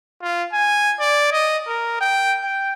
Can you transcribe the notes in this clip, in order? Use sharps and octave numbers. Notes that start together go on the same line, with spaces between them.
F4
G#5
D5
D#5
A#4
G5
G5